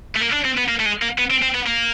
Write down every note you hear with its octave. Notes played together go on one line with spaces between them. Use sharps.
A3
A#3
D4
C4
B3
A#3
A3
G#3
A#3
B3
C4
C4
B3
A#3